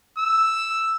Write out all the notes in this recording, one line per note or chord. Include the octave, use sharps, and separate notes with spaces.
E6